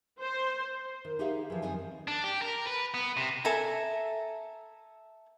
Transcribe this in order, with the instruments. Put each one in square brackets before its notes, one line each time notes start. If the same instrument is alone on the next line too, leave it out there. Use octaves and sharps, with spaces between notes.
[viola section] C5
[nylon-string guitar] D#3
D#4 G4 G#4 E5 F5
E3 F3
F#2 D#3 C4 D#5 G#5
[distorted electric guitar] D4
G4
A#4
B4
B3
C3
[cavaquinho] A4 E5 G#5 A#5